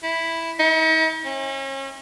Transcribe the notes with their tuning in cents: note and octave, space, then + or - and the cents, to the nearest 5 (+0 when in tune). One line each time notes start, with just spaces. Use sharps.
E4 +0
D#4 +45
C#4 -40